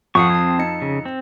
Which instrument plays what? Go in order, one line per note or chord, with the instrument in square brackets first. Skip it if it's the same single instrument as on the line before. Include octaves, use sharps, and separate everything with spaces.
[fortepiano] F2 [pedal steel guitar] F#5 C#6 [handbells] A5 D#6 C7
[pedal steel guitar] C4 [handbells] A5 G#6
[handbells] D#4 D#5 C#7
[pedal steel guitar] C#3
C4